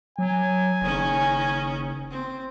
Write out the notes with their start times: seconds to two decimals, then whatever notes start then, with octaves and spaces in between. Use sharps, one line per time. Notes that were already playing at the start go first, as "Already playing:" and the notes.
0.19 F#3 G#5
0.82 F#1 D#3 C#4
2.11 C4